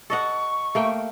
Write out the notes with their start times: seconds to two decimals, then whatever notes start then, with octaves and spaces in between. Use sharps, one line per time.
0.10 A4 D#5 F#5 C#6
0.75 A3 A#3 G5